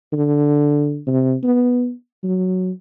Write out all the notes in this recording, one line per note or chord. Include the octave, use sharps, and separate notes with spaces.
D3
C3
B3
F#3